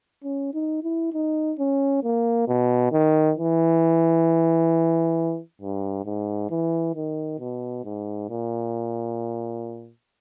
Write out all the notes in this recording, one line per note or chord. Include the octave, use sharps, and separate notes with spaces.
C#4
D#4
E4
D#4
C#4
A#3
B2
D#3
E3
G2
G#2
E3
D#3
B2
G#2
A#2